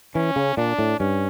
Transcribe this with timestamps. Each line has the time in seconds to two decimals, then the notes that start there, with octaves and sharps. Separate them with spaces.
0.15 E3 C#4
0.36 C#3
0.57 A#2 D4
0.78 A2
0.99 G2 C#4